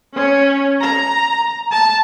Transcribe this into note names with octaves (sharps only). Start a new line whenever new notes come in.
C#4
A#5
A5